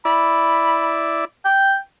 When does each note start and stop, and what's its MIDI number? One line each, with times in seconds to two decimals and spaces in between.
0.05 1.25 64
0.05 1.25 74
0.05 0.93 83
1.45 1.77 79